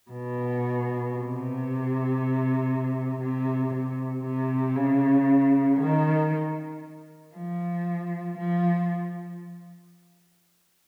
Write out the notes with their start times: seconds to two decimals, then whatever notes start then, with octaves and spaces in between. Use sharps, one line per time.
0.11 B2
1.14 C3
3.21 C3
3.73 C3
4.25 C3
4.76 C#3
5.79 D#3
7.35 F3
8.37 F3